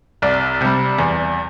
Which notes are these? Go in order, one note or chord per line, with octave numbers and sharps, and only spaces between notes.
C2 D5
C3 G3
E2